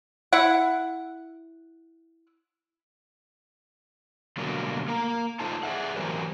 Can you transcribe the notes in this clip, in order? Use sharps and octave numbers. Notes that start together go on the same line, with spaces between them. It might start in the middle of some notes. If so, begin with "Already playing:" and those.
E4 F#5
B2 D3 F#3 G3 A#3
A#3 A#4 A#5
D#4 F4 A4 C5 A5
G#4 D5 E5 F#5
E3 F#3 G3 G4 A#4 C5